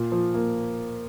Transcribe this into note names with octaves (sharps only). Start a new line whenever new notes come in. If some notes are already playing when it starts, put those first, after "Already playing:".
Already playing: A#2
F3
A#3